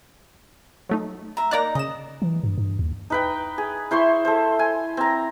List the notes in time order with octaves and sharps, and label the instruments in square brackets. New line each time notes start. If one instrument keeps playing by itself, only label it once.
[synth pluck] F#3 A3 D#4
[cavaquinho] E5 A#5
[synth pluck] A#3 D5 F#6 [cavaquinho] D#4 A#5
[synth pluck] C#3 E7 [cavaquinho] D#5
[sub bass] E3
G2
G2
D#2
[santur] D#4 B4 G5
G#4
E4 C5 C6 C#6
A4 C5
G#5
C4 A#5